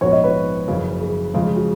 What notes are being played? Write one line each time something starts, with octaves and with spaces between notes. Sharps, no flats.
A#1 G#2 F3 B3 F#4 C#5
D#5
B4
F#1 F2 C#3 F#3
G#4
F2 C#3 F3 G#3 G#4
G#4
F#4